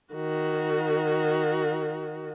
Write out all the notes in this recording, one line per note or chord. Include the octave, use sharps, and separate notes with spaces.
D#3 F#4